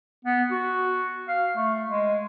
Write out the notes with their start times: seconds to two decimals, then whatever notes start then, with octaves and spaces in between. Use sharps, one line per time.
0.25 B3
0.51 F#4
1.28 F5
1.56 A3
1.88 G#3